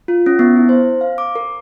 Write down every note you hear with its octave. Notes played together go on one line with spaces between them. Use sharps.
F4
C#4
B3
E4
C5
F5
D6
A#4